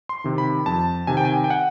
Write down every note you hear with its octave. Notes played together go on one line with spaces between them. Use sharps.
C6
C3 D#3
B5
F2 A5
C3 D#3 G#5
G5
G#5
G5
F#5